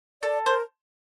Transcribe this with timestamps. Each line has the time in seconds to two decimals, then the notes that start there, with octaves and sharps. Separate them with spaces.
0.22 A4 D5
0.46 A#4 C5